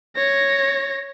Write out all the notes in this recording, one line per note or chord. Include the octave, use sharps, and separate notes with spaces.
C#5 A#6